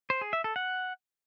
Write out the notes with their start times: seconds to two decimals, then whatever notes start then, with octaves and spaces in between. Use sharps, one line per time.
0.10 C5
0.21 G#4
0.33 E5
0.44 A4
0.56 F#5